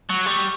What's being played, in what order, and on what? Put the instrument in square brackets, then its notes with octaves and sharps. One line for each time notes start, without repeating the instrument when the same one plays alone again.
[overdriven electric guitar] F#3
[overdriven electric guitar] G3 [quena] C#6